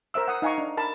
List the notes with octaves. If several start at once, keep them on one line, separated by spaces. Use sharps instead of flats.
A#4 C5 E5 E6
F#5 D#6
D#4 F5 G#5 A#5 C#6
D4
A#4 A5 B5